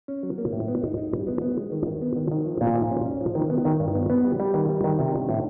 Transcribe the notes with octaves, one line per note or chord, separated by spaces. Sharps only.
C#4
F#3
A#3
A2
B3
D#4
D#4
G3
B3
B3
G#3
D#3
D#3
B3
D#3
D#3
F3
A#2
F3
C#4
C#4
F3
D#3
B3
D#3
G2
B3
B3
G3
G3
D#3
G3
D#3
C3
D4
A2